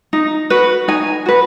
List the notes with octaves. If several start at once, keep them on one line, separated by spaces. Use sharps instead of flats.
D#4
F#4 B4
D#4 G#5
F#4 B4